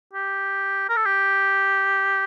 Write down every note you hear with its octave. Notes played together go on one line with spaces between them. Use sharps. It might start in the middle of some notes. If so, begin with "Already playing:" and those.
G4
A#4
A4
G4